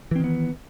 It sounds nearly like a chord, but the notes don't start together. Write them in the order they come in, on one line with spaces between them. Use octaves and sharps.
E3 C4 D#3 B3